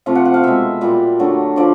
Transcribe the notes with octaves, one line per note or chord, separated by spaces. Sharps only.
C3 F3 A3 F5
F#5
F#5
F5
B2 G#3 E5
A#2 G3
D3 F#3 A3
D3 F3 D5